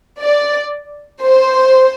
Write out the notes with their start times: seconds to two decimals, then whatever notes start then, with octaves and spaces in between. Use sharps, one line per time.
0.21 D5
1.22 C5